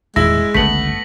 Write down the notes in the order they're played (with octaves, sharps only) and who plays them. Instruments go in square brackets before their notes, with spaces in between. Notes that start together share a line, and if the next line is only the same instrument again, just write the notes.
[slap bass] D#1 E2 G#2 [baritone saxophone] G#3 [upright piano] E4 [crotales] A#6
[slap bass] G1 C#2 G2 [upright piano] A3 B3 [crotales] B6 F#7